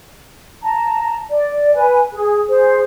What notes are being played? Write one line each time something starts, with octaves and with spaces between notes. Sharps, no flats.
A5 A#5
D5
B4 G#5
G#4
G#4 C5